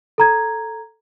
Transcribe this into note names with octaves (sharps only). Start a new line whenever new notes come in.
A4 A#5 G#6